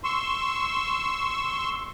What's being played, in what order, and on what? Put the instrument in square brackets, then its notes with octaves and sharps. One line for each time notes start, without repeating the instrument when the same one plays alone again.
[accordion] C6 C#6 E6